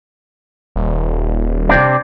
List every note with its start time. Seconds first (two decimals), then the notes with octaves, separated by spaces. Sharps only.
0.76 D#1
1.69 C3 C4 D4